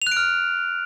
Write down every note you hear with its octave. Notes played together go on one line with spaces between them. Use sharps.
F7
F#6
D7
F6